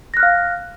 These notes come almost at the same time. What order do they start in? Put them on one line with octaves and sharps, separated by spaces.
A#6 F#6 F6 F5